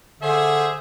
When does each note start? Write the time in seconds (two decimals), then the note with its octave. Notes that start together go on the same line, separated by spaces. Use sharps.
0.21 D3 G#4 C5 E5